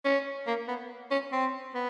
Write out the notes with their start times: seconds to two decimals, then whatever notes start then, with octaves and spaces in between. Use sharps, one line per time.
0.05 C#4
0.47 A#3
0.68 B3
1.11 C#4
1.32 C4
1.74 B3